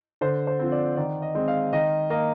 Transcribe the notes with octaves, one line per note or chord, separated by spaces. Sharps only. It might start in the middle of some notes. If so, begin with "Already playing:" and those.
D3 C5
C5
F3 C4
D5
D#3 D5
D#5
G#3 C4
F5
D#3 D#5
A#3 D#5